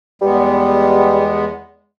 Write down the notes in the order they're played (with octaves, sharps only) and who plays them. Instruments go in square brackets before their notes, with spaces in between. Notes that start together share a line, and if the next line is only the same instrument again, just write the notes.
[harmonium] E2 G#3 B3 [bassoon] G3